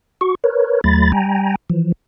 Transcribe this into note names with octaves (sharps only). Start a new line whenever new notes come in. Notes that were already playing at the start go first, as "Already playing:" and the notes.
F#4 C#6
A#4 B4 C#5
D#2 F#3 A3 B5 A6
G3 G5 G#5 A#5
E3 F3